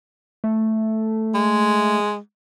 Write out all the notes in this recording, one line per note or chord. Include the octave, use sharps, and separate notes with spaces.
A3
G#3